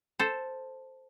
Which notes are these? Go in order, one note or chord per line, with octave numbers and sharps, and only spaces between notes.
A4 C5